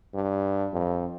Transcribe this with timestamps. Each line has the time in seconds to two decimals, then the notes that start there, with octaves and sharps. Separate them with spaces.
0.14 G2
0.73 F2